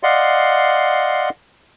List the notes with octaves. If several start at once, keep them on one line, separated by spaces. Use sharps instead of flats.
D5 D#5 F5 F#5 C6